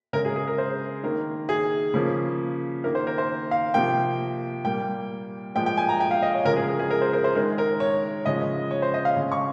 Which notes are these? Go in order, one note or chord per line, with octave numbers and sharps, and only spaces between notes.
C#3 G#3 A#4
G#4
G#4
A#4
C5
D#3 A#3 A#4
G#4
C#3 F3 A#3
D#3 A#3 A#4
C5
A#4
C5
F5
C3 F3 A#3 G5
A#2 G3 A#3 G5
A#2 F3 G#3 G5
G5
G#5
A#5
G5
F5
D#5
C#5
C#3 F3 G#3 A#4
G#4
A#4
G#4
A#4
C5
A#4
C5
D#3 G#3 A#4
A#4
C#5
C#3 F3 G#3 D#5
C#5
C5
D#5
F5
C#3 G#3
C#6